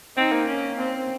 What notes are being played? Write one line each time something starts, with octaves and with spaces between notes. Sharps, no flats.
C4 D#4
A#3
C#4
C4